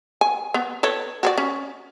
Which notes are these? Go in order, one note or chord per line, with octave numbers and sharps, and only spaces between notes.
G#5
B3
A4 B4 C#5
F#4 C#5 D5
C#4